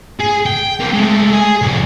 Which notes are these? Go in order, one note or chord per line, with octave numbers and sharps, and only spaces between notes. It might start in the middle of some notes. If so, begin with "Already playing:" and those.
G#4
G5
A#3 C4
G#3 A3
G#4
C2 F2